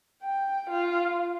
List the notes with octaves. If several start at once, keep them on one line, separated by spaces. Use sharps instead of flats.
G5
F4